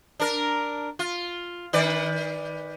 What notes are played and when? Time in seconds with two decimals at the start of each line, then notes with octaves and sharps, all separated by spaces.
0.20 D4 A#4
0.99 F4
1.73 D#3 B4 D5